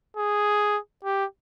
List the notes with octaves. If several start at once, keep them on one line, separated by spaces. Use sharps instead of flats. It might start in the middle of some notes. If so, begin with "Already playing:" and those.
G#4
G4